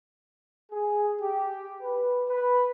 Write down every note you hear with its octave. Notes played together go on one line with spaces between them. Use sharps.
G#4
G4
B4
B4